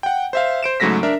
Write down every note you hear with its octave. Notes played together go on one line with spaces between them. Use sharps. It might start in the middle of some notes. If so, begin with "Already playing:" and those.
F#5 G5
C5 E5 F5
C5 D7 E7
G#2 C#3 F#3 A3 A#6 B6
D4 A#4 E5